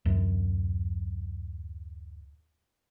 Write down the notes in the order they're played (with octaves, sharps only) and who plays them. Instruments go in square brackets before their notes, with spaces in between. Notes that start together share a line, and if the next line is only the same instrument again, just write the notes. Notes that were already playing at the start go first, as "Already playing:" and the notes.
[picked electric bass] D1 F#2